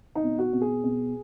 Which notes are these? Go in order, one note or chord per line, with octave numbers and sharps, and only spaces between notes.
D#4
B2
F#4
B2
G#4
B2